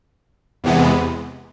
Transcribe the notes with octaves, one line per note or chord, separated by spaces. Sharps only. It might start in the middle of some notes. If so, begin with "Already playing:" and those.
E2 C3 E3 G#3 B3